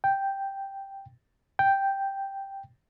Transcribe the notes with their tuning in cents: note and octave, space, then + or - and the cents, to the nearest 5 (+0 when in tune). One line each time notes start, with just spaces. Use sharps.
G5 +0
G5 +0